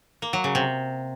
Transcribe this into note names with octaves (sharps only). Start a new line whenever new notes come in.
A#3
F#3
C#3
C3